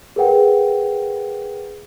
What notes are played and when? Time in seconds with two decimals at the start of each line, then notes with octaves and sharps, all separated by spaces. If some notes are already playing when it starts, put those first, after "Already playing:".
0.16 G#4 A#4 B4 F#5 G5